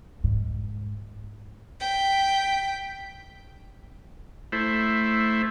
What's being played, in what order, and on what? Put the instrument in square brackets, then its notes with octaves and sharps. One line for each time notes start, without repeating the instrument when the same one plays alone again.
[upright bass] G#2
[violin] G5 B6
[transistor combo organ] A3 E4 C5